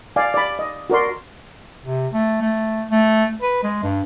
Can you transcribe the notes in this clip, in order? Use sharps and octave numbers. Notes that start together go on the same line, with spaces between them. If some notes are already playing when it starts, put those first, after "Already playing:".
D5 F5 G#5
D5 B5
D#5
F#4 A#4 D5 C6
C3
A3
A3
A3
B4
G#3
G2